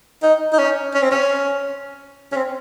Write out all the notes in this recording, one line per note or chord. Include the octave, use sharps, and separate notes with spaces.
D#4
D#4
C#4
C#4
C4
C#4
C#4
C4